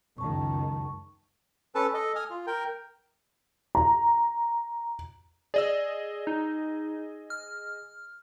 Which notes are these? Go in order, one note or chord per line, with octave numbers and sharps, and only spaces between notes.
C#2 F#2 D#3 A5 C#6
C#4 A4 B4 A5
A4 D#5
G#5 D#6 F6
F4
A#4 G5
A#5
G#4 D5 D#5 E6
D#4
F6